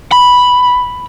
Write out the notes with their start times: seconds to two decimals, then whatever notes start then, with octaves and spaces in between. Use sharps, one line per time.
0.12 B5